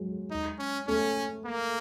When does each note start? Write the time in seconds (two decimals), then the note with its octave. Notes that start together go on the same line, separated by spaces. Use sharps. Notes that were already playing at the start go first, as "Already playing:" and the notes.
Already playing: F#3 G#3
0.31 D#4
0.59 C#4
0.87 A3 C#4
1.45 A#3